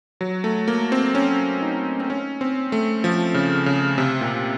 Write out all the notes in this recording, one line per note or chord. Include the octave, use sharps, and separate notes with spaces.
F#3
A3
A#3
C4
C#4
D#4
C4
C#4
C4
A3
F3
C#3
C#3
C3
A#2